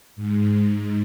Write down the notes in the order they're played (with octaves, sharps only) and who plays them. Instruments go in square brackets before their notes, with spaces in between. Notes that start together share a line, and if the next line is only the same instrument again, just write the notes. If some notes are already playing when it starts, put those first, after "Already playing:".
[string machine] G#2